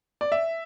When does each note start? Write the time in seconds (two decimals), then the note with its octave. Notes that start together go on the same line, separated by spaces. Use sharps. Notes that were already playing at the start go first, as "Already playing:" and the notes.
0.21 D5
0.32 E5